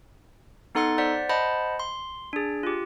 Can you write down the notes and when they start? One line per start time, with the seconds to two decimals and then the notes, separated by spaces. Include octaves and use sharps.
0.75 B3 D#4 A4 F#5 C6 A6
0.98 C5 D5 F#5 B6
1.29 C5 D#5 F#5 A5 B5
1.79 C6
2.33 D4 G#4
2.63 F4 G4